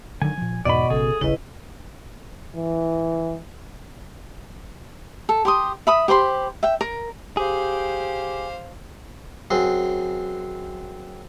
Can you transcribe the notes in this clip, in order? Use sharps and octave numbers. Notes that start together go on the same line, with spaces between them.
D3 D#3 F#3 G#5
A#2 F3
E2 G#2 B2 D5 D#5 F#5 B5 C#6
G#1 C#3 G#4 A4
D#1 G#1 C#3 E4 B4 D#5
E3
A4
G4 C6 D#6
E5 B5 D#6
G4 C5 B5 C6
E5 G5
A#4
G4 G#4 C5 F5
F#2 C4 G#4